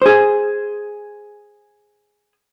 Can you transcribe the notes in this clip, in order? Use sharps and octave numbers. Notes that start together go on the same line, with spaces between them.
G#4 C5